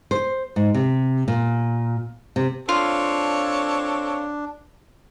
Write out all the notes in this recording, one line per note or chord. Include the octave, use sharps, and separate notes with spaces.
C5
G#2
C3
A#2
C3
C4 D4 F4 A4 C#5